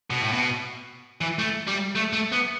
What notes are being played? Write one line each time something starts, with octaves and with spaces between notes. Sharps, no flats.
B2
A2
B2
E3
A3
G3
A3
A3
B3